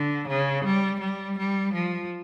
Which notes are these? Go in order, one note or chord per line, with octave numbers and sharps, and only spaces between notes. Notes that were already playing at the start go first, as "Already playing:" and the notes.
Already playing: D3
C#3
G3
G3
G3
F3